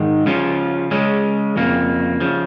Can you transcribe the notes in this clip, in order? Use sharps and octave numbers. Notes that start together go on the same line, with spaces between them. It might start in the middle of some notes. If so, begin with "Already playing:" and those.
Already playing: G#2 D#3 G#3
C#3 F3 C#4 F4
C#3 G#3 C#4
F2 C#3 A#3
C#3 F3